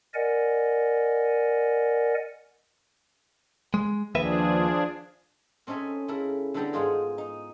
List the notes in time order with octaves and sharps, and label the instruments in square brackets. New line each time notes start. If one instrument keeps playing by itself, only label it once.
[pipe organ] A#4 D5 D#5 F#5 G#5
[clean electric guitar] G#3
[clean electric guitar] D#2 B4 E5 [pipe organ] F3 D4 G#4
[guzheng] C4 C#4 D#4 A4 E5 G#5
C#3 E4 A4 A#4 E5
D3 G3 B3 A4 G5 A#5
G#2 G#3 D#4 F4 G#4
D#4